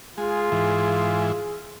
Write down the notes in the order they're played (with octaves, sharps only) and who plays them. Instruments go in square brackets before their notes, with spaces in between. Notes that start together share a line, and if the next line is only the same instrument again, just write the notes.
[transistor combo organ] G#3 [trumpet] F4 [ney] G#4
[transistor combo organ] G#2 E3